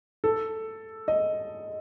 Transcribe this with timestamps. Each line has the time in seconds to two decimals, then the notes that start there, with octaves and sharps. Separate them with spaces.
0.24 A4
1.08 D#5